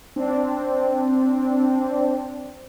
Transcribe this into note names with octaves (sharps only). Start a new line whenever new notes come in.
C4 D4